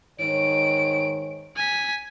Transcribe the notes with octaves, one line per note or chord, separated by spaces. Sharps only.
G#2 D#3 C#5 D7
G#5 B6